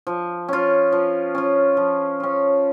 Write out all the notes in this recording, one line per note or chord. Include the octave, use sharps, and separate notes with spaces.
F3
C#4 F4
F3
C#4 F4
F3
C#4 F4